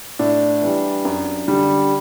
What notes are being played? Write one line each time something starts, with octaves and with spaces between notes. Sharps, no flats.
A2 D4
E3 G3
F#2
D3 G3